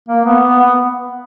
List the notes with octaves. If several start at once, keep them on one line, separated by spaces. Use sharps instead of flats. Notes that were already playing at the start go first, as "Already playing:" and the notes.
A#3
B3
B3
B3